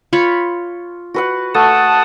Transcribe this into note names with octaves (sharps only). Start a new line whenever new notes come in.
F4 C#5 B5
F#4 B4 F#5
A3 F#5 A5 D#6